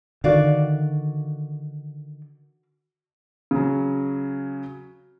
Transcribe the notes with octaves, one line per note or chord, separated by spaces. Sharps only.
D3 D#3 F#4 D5 F5
C#3 F#3